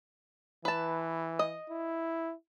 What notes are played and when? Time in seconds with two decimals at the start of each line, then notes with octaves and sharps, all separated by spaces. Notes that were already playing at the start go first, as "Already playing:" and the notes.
0.65 E3 B4 A5
1.39 D#5
1.70 E4